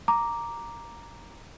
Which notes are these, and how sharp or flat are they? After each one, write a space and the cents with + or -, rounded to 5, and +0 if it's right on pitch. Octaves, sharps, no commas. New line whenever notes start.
A#5 +0 D6 +0